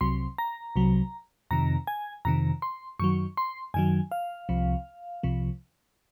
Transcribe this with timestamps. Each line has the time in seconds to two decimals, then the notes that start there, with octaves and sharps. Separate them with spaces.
0.01 C2 C3 F#3 C6
0.38 A#5
0.76 C2 C3 F#3
1.51 F2 C3 D#3 A#5
1.87 G#5
2.25 F2 C3 D#3 A#5
2.62 C6
2.99 F#2 D#3 F#3 C#6
3.37 C6
3.74 F#2 D#3 F#3 G#5
4.11 F5
4.49 C2 C3 F3
5.23 C2 C3 F3